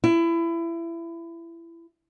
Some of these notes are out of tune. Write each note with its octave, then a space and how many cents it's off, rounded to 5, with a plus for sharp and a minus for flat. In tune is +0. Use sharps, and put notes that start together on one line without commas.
E4 +25